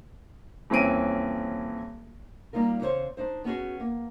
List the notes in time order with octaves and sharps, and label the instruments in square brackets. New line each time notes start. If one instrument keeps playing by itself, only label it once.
[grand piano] D#1 E3 C4 C#4 D7 D#7
[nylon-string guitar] G3 A#3 D#4 F4 A#4
E2 C#3 G4 C5 C#5
D4 D#4 C5
B3 C#4 F#4 G#4
A#3